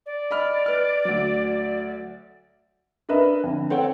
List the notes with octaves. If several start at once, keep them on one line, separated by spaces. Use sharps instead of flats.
D5
D#5 B5 F6
B4 F6
D2 F#3
D4 A#4 B4 D#5 E5
F2 D3
C4 A4 C#5 F#5 G5